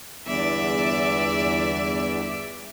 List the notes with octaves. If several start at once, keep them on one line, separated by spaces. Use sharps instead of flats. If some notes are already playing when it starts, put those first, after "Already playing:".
G1 E2 D5 E5